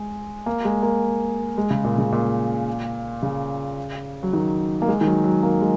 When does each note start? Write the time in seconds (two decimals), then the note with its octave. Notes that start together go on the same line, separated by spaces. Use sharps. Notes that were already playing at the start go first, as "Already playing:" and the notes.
Already playing: G#3
0.46 A#3
0.65 G#3
0.83 A#3
1.58 G#3
1.71 C#3
1.84 A#2
1.98 C#3
2.12 A#2
3.23 C#3
4.23 F#3
4.33 D#3
4.82 A#3
4.88 G#3
5.01 D#3
5.07 F#3
5.24 F#3
5.43 A#3
5.61 G#3